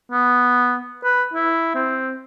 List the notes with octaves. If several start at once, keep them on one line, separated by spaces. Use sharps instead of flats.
B3
B4
E4
C4